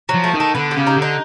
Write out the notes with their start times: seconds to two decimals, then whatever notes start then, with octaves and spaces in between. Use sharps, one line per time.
0.09 F#3
0.14 F3
0.24 A3
0.34 D#3
0.40 A3
0.55 D3 B3
0.71 G4
0.76 C#3
0.87 D#4
0.97 D3
1.02 D#4